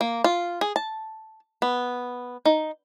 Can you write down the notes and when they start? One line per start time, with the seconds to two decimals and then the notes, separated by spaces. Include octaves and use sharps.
0.01 A#3
0.24 F4
0.61 G#4
0.76 A5
1.62 B3
2.45 D#4